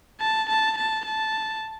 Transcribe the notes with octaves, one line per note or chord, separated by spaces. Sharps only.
A5
A5
A5
A5